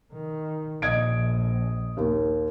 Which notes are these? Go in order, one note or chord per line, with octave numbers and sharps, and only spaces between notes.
D#3
A#1 D#5 G#6 D7
D#2